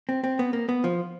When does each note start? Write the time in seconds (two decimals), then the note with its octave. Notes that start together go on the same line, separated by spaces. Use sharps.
0.09 C4
0.24 C4
0.39 B3
0.53 A#3
0.69 B3
0.84 F3